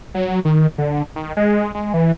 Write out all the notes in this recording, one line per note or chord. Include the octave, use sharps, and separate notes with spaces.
F#3
D#3
D3
D#3
G#3
G#3
E3